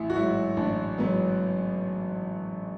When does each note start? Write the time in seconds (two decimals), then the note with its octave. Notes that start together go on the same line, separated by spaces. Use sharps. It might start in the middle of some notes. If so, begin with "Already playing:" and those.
Already playing: A1 E4
0.10 F#4
0.16 G#2 F#3 E4
0.57 A1 D4
0.98 G#2 F#3 B3